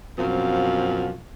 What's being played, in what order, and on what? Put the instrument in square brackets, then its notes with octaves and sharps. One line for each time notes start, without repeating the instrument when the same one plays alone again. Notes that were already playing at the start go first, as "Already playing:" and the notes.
[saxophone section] F#2 B2 F3 C4 F5